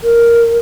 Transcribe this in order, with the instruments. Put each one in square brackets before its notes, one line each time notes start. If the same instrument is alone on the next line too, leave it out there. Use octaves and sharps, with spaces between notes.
[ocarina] A#4